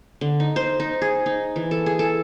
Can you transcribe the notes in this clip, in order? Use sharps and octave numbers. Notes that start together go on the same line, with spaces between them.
D3
D#4
C5
D#4
G#4
D#4
E3
A4
G#4
A4